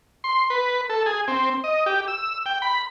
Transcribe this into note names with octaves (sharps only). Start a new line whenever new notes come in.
C6
B4
A4
G#4
C4
D#5
G4
E6
G5
B5